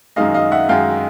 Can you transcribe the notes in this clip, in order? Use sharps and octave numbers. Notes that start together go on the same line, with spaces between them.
F#2 D#3 G#3 D#5 F5
D#5 F5
E5 F#5
F#2 D#3 G#3 F5 G5